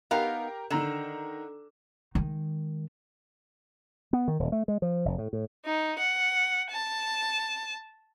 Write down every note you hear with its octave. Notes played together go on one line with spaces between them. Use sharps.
B3 D#4 G4 A#4 F5 A#5
D3 D#3 A#5 E7
D#3 G#3
B3
D#3
D#1
A3
G#3
F3
F1
A2
A2
D#4
F#5
A5